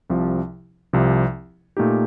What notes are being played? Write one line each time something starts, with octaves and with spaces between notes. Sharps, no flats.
C2 C3 F3
C2 C3 F3
A#2 A3 D#4 G4